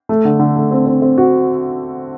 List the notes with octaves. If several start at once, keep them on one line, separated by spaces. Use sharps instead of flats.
A3
D3
D3
A3
C4
C4
C4
F#4